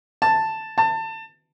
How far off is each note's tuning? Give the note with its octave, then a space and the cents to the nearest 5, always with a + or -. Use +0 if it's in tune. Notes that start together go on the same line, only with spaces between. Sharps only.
A5 +5
A5 +25